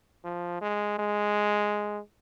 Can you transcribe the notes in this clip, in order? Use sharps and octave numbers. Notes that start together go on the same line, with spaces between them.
F3
G#3
G#3